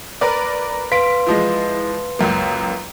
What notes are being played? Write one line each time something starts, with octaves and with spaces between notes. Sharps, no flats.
A#4 B4 D5
B4 F5 C6 B6 D7
E3 F3 G#3
C#2 F#2 A#3